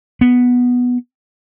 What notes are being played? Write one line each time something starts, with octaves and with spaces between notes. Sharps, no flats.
B3